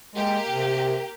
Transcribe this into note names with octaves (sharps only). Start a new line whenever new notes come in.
G#3 A#3 G4 A#4
C3